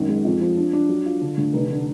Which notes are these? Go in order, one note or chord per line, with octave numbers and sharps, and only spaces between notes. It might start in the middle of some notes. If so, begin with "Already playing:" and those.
Already playing: G#1 F#2
G#3
F2
F3
D4
D4
F#3
F4
D3
D2
F1
D3